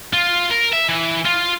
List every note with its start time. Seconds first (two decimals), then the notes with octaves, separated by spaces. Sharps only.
0.13 F4
0.50 A#4
0.73 E5
0.89 E3
1.26 F4